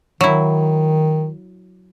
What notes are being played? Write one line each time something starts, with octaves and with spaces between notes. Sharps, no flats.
D#3 F#3 E4